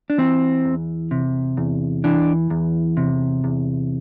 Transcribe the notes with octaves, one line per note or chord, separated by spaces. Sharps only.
D4
E3 C4
E2
C3
E2
E3 D4
E2
C3
E2